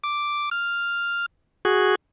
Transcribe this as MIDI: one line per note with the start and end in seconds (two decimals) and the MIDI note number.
0.04 0.49 86
0.51 1.26 89
1.65 1.95 66
1.65 1.95 68